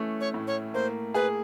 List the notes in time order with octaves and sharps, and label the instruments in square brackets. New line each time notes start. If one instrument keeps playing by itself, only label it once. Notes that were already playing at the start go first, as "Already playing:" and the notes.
Already playing: [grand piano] E3 A3 C#4
[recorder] C#5
[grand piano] A2
[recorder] C#5
[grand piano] A#3 [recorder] C5
[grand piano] G#4 [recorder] B4